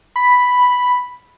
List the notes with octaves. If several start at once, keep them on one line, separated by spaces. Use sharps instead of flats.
B5